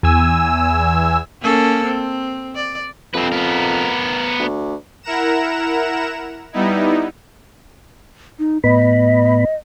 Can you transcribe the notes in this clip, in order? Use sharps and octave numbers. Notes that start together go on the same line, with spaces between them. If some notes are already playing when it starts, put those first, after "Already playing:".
E2 G#5 E6
A#3 C#4 A4
C4
D5
F2 C4 B4
B3 A#4
D2
E4 A#4 F#5 A#5 E7
G3 B3 D#4 E4
D#4
A2 B3 D#5 B5